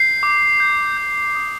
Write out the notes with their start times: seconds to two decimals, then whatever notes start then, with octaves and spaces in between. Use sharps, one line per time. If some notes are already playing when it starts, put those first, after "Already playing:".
Already playing: G6 C7
0.23 D6
0.60 G6
0.97 G6
1.35 D#6